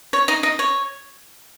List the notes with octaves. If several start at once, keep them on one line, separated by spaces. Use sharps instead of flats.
C#5
D#4 D#5
D#4 D#5
C#5